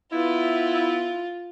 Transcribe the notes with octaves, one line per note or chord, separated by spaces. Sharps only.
B3 E4 F4